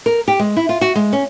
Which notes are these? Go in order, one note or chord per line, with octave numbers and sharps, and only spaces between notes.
A#4
G4
G#3
E4
F4
F#4
G#3
C#4